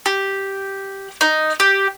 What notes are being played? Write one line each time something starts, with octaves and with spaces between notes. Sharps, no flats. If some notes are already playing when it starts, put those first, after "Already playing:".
G4
D#4
G4